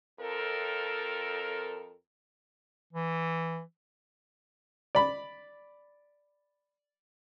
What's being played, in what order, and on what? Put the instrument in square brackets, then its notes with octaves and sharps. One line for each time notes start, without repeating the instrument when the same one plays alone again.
[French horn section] F2 A4 A#4
[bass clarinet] E3
[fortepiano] D5 B5